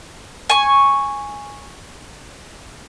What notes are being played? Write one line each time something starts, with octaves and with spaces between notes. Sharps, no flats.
G#5 C#6